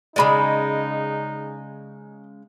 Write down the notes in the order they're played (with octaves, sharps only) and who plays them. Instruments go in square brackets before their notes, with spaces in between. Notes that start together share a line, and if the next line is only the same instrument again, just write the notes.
[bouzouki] C#3 F3 G#3 [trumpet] D#4 [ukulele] D5 D#5 B5